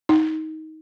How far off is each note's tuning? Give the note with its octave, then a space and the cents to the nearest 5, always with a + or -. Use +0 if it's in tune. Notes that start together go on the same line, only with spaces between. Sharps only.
D#4 +20